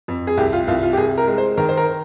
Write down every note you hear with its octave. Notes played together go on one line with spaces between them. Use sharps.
F2
G#4
C2 G4
F4
C2 F4
F4
G4
C2 G#4
A#4
G#3
C5
D#3 A#4
C5
A#4